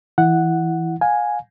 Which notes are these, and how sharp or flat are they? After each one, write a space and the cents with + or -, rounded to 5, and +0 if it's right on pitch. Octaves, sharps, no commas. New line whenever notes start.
E3 +0 E4 +0 F#5 +0
F5 +30 G#5 +0